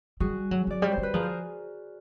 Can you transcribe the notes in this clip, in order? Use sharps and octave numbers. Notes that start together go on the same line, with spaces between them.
G3 F#4 G#4
F#3
F#3 D5
G3 C#5
C5
G3
B4
F3 G#4 A#4
C5